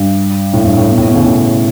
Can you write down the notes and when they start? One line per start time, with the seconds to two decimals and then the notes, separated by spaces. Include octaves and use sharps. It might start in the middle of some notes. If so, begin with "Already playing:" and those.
Already playing: G2
0.53 A2
0.64 G2
0.78 A2
0.89 B2
0.97 A2
1.07 B2
1.16 C#3
1.24 A2